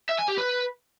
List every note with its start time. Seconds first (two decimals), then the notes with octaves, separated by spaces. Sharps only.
0.09 E5
0.19 G#5
0.28 G4
0.38 B4